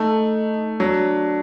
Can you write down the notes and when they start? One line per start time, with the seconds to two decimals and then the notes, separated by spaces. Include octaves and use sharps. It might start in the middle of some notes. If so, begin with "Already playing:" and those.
Already playing: A3 D#4
0.79 F#3 D4